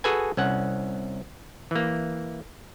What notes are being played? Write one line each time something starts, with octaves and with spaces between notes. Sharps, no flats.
F#4 G#4 A4 B4 G#5
C2 C#4 F#5
E3 A#3